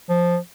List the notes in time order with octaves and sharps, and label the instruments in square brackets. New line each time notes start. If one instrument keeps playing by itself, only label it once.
[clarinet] F3